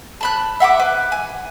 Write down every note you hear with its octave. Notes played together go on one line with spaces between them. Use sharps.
A5 B5 F#6
E5 F#5 B5 D6
B4
G#5